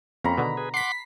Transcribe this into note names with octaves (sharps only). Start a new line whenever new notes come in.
F2 A#3 C4 C#4 A#5 B5
B2 D3 D#3
G#4 B4
F#5 C6 D6 B6 C7